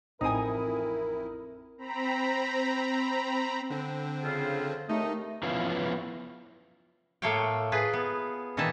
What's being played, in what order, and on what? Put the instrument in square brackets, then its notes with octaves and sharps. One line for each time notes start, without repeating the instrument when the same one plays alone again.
[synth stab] A1 C4 D#6 [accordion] F2 E4 [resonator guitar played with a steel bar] D#4 G#5 [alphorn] A#4
[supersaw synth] C4 A#5 B5
[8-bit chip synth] D3 C4
[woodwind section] F2 C#3 F4
[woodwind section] D#2 D#6 [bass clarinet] A3 [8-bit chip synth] D#4
[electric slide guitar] E3 F3 B3 C#4 E4 F4
[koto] A2 A3 A#3 C#5 F5 G5
F4 G#4 B4
B3
A#2 D#3 E3 E4 D#5 A5